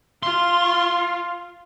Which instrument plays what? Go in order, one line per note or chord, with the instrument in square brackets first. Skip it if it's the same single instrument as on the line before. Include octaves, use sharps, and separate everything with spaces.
[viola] F4 [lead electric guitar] C6